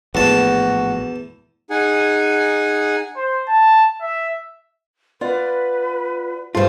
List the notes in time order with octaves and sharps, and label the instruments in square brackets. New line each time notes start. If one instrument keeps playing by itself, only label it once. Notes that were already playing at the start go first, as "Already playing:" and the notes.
[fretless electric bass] A#1 A2 [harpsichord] E2 A5 [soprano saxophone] F#4
[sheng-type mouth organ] D#4 G#4 F#5 G#5
[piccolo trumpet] C5
A5
E5
[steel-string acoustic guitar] F4 D5 F#5 [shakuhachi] B4
[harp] G2 A4 [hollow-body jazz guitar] F3 F4